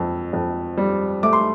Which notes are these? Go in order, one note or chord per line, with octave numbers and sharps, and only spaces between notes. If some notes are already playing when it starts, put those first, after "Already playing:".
Already playing: F2
F2
G3
A3 D6
C6